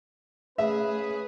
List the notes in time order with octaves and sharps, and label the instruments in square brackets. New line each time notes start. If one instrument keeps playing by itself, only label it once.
[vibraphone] A3 [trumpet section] C#4 B4 [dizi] G#4 [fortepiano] E5